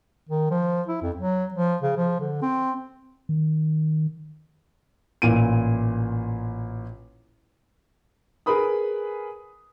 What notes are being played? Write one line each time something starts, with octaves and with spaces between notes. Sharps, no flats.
D#3
F3
E4
F2
F#3
F3
C#3
F3
D3
C4
D#3
A1 A#2 D7 D#7
G#4 A#4 B4 B5 D#6